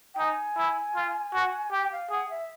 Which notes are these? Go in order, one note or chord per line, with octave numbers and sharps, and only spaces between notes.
G5
D#4 G#5
E4
F4
F#4
G4 G5
F5
G#4 F#5
E5